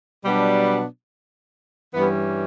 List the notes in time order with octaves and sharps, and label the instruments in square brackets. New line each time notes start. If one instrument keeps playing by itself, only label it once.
[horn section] B2 F#3 B3 D4 [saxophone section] G3
[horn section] G2 E3 G3 C#4 [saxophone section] B3